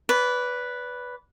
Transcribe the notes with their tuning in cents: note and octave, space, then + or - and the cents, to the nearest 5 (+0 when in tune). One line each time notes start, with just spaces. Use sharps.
B4 +0 D5 -30